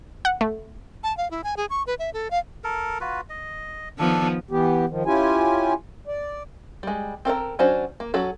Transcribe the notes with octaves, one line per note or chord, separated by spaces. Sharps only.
F#5
A3
A5
F5
E4
G#5
G#4
C#6
B4
E5
A4
F5
A4 A#4
F4 F#4 B4
D#5
D#3 F3 B3 D4 A4
E3 B3 G4
D#3 F3
C#4 E4 F4 G4 G#5
D5
G3 G#3
C4 A4 A#4 A#5
F#3 C#4 D4 F#4 C5
A#3
F#3 C#4 F#4 A4